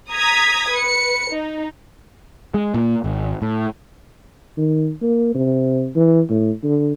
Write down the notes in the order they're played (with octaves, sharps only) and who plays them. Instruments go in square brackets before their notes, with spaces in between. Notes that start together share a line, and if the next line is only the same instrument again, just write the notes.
[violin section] A#5 D#6 G#6 B6
B4 C#7
D#4
[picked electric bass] G#3
A#2
G#1
A2
[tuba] D#3
A#3
C3
E3
A2
D3